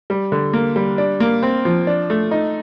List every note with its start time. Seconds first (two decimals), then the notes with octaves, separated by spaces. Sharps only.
0.10 G3
0.32 D3
0.53 A#3
0.76 G3
0.98 D4
1.20 A#3
1.43 C4
1.65 F3
1.87 D4
2.10 A3
2.31 D#4